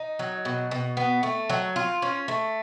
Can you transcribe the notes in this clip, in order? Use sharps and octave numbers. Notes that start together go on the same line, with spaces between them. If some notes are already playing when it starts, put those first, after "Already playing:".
Already playing: D#4
F#3
B2
B2
B3
A3
F#3
F4
C#4
A3